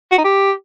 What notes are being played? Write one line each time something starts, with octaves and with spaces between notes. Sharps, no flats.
F#4
D#4
G4